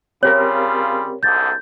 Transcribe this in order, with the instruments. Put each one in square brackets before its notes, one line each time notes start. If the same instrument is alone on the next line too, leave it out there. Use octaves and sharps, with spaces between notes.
[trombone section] C#3 G3 F4 [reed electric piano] C4 G4 A#4 [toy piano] C#5
[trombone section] C2 G#2 D3 [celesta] G6 A6